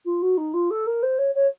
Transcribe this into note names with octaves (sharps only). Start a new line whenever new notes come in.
F4
F#4
D#4
F4
A4
A#4
C5
C#5
C#5